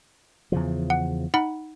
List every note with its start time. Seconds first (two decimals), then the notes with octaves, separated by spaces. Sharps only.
0.52 E2 C#3 F3
0.90 F#5
1.34 D#4 F#5 B5